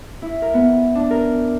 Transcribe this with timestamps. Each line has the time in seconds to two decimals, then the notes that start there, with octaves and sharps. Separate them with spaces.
0.22 E4
0.42 A#4
0.54 B3
0.95 D4
1.11 A#4